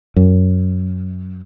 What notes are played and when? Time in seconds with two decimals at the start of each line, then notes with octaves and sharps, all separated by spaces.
0.16 F#2